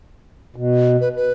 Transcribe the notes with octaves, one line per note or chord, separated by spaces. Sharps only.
B2
B4
B4